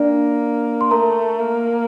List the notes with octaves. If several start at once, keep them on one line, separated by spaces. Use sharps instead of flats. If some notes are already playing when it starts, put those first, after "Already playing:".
Already playing: A#3 D4 D5
C6
A3 A#4 A#5
A#3